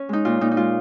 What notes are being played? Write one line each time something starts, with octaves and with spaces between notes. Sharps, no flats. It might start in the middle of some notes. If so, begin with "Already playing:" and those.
Already playing: C#4
G#3 D#4
A#2 F4
A#2 D#4
D#4
G#3 F4